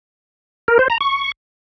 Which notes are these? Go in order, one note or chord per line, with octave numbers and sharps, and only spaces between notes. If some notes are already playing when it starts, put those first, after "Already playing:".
A#4
C5
A#5
C#6